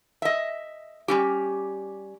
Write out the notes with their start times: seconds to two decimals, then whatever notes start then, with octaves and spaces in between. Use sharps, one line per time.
0.22 D#5 E5
1.08 G3 C#4 G4